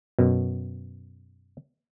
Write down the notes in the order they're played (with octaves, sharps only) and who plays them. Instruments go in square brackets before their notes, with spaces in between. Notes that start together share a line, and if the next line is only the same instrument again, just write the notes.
[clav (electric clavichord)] F#2 B2